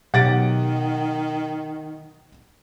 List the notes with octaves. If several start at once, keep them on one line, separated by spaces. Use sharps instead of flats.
B2 D#3 F#3 G4 F#5 A6 D7